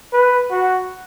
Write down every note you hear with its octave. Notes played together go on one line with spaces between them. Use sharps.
B4
F#4